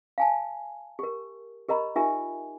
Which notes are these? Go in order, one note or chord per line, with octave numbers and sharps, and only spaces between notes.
F5 G#5 A5
G4 A#4
G4 A#4 D#5 A#5 B5
D#4 F4 G4 A#4 E5 G#5